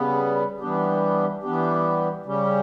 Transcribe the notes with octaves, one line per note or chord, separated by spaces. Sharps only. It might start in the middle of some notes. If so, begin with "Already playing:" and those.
Already playing: C#3 G3 B3
E3 G3 B3 D4 G4
E3 G3 B3 D4 G4
C#3 G3 C#4 G4